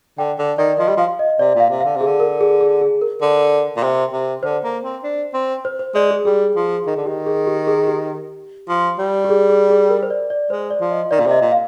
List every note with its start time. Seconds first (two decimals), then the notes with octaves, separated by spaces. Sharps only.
0.18 D3 G5
0.38 D3
0.58 D#3 D5
0.79 F3 D#5
0.88 G3
0.97 F3 F5
1.19 D#5
1.39 C3 D5
1.55 A#2
1.60 F5
1.70 C3
1.80 D3 F5
1.96 C3 G#4
2.06 D3
2.20 A#4
2.41 G#4
2.61 G#4
2.81 G#4
3.02 A#4
3.22 D3
3.76 A#2
3.83 C3
4.13 C3
4.43 D3 C5
4.64 A#3
4.84 C4
5.03 D4
5.34 C4
5.65 C5
5.79 C5
5.94 G#3 D5
6.11 G#4
6.25 G3 G#4
6.56 F3
6.85 D#3 G#4
6.97 D3
7.06 D#3 G4
7.26 G#4
7.47 G4
7.67 G#4
7.87 G4
8.69 F3
8.99 G3
9.24 G4
9.29 G#4
9.50 G#4
9.70 G#4
9.90 A#4
10.03 C5
10.10 D5
10.30 D5
10.50 G#3 C5
10.70 D5
10.81 F3
10.91 D#5
11.11 D#3 D5
11.20 A#2
11.26 C3 D#5
11.41 A#2
11.52 F5